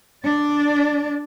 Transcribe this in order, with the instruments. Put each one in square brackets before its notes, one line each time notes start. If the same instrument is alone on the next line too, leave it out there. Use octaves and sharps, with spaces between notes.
[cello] D4 D5